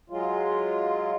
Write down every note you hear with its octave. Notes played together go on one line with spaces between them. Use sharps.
F#3 G#3 F4